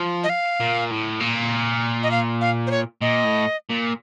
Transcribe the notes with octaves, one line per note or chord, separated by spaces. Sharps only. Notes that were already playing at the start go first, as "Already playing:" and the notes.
Already playing: F3
D#5
F5
A#2
A2
A#2
D#5
F5
F5
C5
C#5
A#2 D#5
A2
A#2